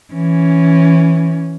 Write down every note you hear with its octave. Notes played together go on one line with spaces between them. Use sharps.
E3 C#4